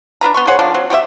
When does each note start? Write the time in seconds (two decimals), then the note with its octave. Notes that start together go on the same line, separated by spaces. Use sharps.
0.21 D4 F4 B4 A#5
0.34 B3 C6 C#6
0.47 G#4 C5 C#5 F#5
0.59 D3 F3 A#3 D4
0.74 F#3 C4
0.90 F#4 G4 C5 E5